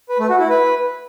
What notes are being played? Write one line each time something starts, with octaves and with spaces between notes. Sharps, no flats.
B4
A3
F#4
E4
B4